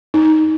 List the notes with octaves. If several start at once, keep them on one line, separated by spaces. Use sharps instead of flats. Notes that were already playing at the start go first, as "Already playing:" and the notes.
D#4